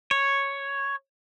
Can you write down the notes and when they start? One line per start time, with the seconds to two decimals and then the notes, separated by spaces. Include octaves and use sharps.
0.11 C#5